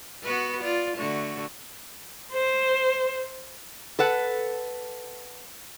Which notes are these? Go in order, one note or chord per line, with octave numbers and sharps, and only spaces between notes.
B3 F#4 B4
F4 D5
D3 A3 F#4
C5
A4 B4 F#5